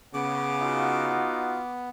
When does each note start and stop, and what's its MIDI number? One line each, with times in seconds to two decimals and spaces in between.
0.14 1.23 49
0.14 1.89 59
0.14 1.71 86
0.61 1.62 63
0.61 1.62 65
0.61 1.62 66